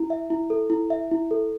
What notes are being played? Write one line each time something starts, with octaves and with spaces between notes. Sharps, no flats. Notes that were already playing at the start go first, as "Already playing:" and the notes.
Already playing: E4
E5
E4
A4
E4
E5
E4
A4